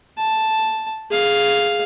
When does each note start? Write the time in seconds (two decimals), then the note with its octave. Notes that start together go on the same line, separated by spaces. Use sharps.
0.17 A5
1.10 G#4 F5